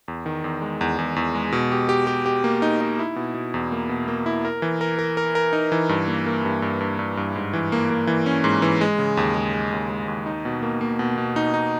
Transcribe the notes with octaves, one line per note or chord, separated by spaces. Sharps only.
E2
D#3
E2
G#3
E2
E2
E2
G#3
B2
G4
G4
G4
G4
A#3
D#4
D#4
E4
B2
B2
E2
A#3
B2
A#3
E4
A#4
E3
A#4
A#4
A#4
A#4
D#4
E3
G2
A#3
A#3
G2
G2
G2
G2
G2
G#2
E3
A#3
A#3
E3
C#4
G#2
E3
G#3
C#3
D#2
G#3
G#3
D#2
G#3
D#2
D#4
B2
A#3
A#3
B2
B2
D#4
D#4